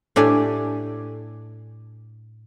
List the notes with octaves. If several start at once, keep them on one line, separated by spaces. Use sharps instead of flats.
A2 D4 G4 G#5